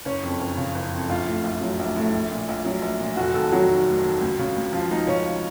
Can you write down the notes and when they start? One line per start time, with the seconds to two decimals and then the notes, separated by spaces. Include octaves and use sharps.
0.05 F#1 C#4
0.23 F2
0.40 F#1
0.57 C#3
0.75 F#1
0.92 F2
1.09 A#1 F4
1.27 A2
1.44 A#1
1.61 F#3
1.79 A#1
1.96 A2
2.14 A#1
2.31 A#2
2.49 A#1
2.65 F#3
2.82 A#1
3.00 A#2
3.17 F1 F#4
3.34 D#2 A4
3.52 F#3 F#4
3.69 D#3
3.87 F1
4.04 D#2
4.21 C#2
4.39 C#3
4.56 C#2
4.73 F3 F4
4.91 C#2 D#4
5.07 C#3 C#4